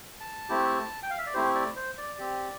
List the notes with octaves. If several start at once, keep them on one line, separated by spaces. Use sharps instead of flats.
A5
A3 C4 E4 G4
G5
F5
E5
D5
A3 C4 E4 G4 C5
D5
C5
D5
C4 G4